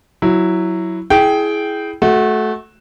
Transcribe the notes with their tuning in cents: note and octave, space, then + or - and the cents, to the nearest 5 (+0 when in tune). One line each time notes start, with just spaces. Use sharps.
F#3 +0 E4 +0
E4 +0 G#4 +15 G5 -10
A3 -20 F#4 +0